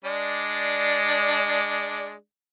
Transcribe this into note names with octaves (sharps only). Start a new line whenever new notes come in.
G#3 D4 D5